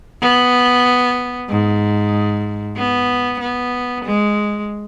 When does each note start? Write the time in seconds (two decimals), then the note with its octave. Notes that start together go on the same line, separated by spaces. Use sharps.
0.21 B3
1.49 G#2
2.77 B3
3.40 B3
4.05 G#3